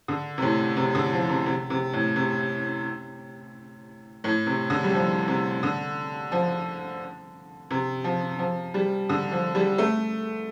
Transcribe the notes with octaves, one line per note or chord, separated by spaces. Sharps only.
D3
C3
A2
C3
D3
F3
C3
C3
C3
A2
C3
A2
C3
D3
G3
F3
C3
D3
F3
C3
F3
F3
G3
D3
F3
G3
A3